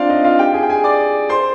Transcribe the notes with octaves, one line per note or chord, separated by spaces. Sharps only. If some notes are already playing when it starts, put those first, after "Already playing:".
Already playing: C4 D4 F4 C5 D5 F5
D#4 D#5
F4 F5
G4 G5
G#4 G#5
G5
G#4 G#5
D5 D6
C5 C6